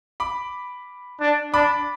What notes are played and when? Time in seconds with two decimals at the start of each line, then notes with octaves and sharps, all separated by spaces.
0.20 B5 D6
1.21 D4
1.54 D4 B5 D6